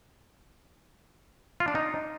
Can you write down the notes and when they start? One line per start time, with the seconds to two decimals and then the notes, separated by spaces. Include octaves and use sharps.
1.60 F4
1.68 D4
1.75 D#4